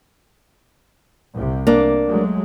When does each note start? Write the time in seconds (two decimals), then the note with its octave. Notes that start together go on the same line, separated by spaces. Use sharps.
1.34 C2 C3
1.67 A#3 D4
2.07 F#3 G#3 A3